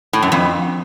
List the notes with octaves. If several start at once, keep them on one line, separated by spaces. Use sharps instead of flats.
A2
F#2
F2